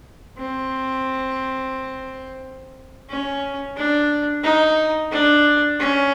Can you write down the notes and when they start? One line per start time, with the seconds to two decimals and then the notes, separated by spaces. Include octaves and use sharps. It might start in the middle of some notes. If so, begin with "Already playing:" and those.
0.38 C4
3.09 C#4
3.77 D4
4.44 D#4
5.11 D4
5.80 C#4